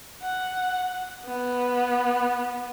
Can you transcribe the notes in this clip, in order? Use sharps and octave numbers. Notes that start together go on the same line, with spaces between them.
F#5
B3